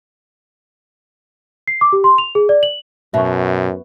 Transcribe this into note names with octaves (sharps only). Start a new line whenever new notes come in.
C7
D6
G4
C6
F7
G#4
D5
F#7
F#2 B2 E5 C#6